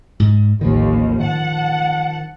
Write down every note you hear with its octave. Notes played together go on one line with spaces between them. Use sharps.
G#2
A1 D#2 D#3 F3
F#5 A5